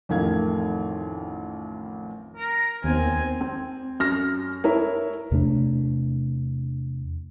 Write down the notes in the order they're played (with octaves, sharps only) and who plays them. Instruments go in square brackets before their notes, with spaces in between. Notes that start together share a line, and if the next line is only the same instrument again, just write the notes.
[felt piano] A1 F2 D#3 A3 F5 G#6
[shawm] A#4
[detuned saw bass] D#2 [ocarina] B3 [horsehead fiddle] C4 [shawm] G#5
[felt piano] C4
F#2 F6 A#6
E4 A#4 C#5
[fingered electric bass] E2 C3 A3 D4